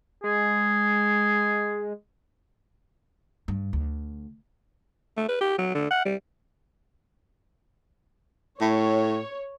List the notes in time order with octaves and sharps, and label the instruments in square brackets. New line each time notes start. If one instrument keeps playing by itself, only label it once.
[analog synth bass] G#3 [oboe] G#4
[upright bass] G2
D2
[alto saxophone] A3
B4
G4
F#3
D3
F#5
G3
[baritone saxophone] A2 [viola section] C#5